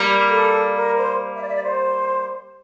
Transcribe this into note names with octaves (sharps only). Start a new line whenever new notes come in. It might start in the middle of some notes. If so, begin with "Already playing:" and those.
Already playing: G3 A#3
A4
A#4
C5
E5
D5
E5
D5
C5